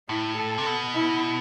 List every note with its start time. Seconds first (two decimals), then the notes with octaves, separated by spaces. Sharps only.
0.09 A2 E4
0.38 A4
0.58 C3
0.66 B2
0.94 E4